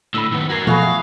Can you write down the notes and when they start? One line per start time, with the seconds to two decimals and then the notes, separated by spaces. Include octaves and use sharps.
0.14 A2 D3 B5 E6
0.32 D#3 B3
0.50 F#4 A#4 G#6 A#6 C7
0.67 B2 F3 A3 F#4 G#4 B4 F5
0.82 E5